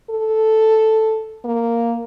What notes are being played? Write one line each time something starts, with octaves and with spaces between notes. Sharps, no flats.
A4
A#3